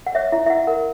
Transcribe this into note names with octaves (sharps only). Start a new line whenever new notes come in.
F#5
C#5 E5
E4 E5
E5
E4 F#5
A#4 F#5